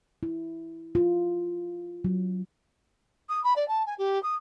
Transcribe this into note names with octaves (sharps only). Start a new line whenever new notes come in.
E4
F4
F#3
D#6
B5
D5
A5
G#5
G4
D#6